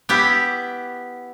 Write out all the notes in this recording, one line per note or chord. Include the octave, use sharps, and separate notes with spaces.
B3 E4 G4